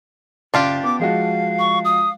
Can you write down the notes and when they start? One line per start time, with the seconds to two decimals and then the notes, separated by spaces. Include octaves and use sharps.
0.54 F#1 D4 F4 G4
0.83 B3 D6
0.99 F3 G#3 F#4 F5
1.59 C#6
1.85 D#6